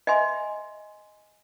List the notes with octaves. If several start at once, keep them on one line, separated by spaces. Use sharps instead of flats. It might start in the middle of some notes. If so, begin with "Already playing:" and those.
D#5 E5 G#5 C6